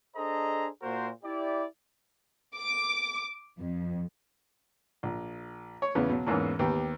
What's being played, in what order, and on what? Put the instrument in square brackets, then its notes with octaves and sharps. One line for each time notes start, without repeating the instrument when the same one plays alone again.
[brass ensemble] D4 G#4 A4 C5 D#5 A#5
A#2 A#3 F#4 A#4 C5
E4 G4 D5
[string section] D6
F2
[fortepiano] A#1
C#5
E2 C#3 B3
B2 F#3
E2 G#2 E3 A#3 C#4
D#2 B3 G4